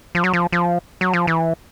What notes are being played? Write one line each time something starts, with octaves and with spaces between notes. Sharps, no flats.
F3
F#3
F3
F3
F#3
F3
E3